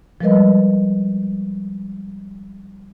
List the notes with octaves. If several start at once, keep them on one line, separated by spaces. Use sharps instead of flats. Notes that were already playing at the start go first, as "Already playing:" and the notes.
F3 G3 G#3 A#4 B4 D#5